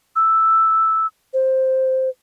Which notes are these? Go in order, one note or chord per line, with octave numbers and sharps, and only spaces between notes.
E6
C5